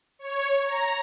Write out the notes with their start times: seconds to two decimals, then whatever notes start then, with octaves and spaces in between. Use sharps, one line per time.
0.19 C#5
0.64 A#5